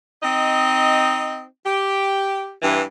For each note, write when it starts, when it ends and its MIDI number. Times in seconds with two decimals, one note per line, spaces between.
0.22 1.43 60
0.22 1.43 63
0.22 1.43 75
1.65 2.51 67
2.62 2.82 43
2.62 2.82 52